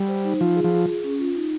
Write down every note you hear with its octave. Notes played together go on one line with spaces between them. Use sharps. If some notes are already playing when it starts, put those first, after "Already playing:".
Already playing: G3
C5
D#4
F3 F4
G#4
F3
F4
G#4
C#4
F4
D#4